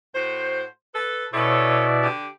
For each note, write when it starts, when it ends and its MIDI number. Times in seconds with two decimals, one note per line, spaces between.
0.15 0.64 45
0.15 0.64 66
0.15 0.64 72
0.95 1.26 69
0.95 1.26 71
1.33 2.08 47
1.33 1.86 61
1.33 2.08 64
1.33 1.86 69
1.33 1.86 73
1.33 2.08 74
2.03 2.28 50
2.03 2.28 62
2.03 2.28 67